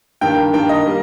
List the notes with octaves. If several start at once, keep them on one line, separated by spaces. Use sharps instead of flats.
G2 D#3 A#3 G5
G2 D#3 A#3 G5
D#5
G3 A#3